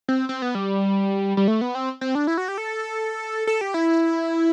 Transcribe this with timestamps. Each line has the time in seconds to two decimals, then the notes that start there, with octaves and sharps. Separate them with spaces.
0.08 C4
0.29 C4
0.42 B3
0.55 G3
1.37 G3
1.48 A3
1.61 B3
1.75 C4
2.01 C4
2.15 D4
2.27 E4
2.38 F#4
2.48 G4
2.58 A4
3.47 A4
3.61 G4
3.74 E4